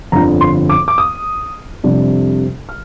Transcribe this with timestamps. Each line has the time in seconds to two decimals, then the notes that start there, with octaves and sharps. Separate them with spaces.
0.12 G1 F2 D3 F3 A#5
0.41 C6
0.69 D6
0.88 D6
0.98 D#6
1.84 F2 C3 G3 D4
2.69 F6